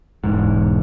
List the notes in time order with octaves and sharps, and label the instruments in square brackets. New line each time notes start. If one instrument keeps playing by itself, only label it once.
[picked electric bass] E1 G#2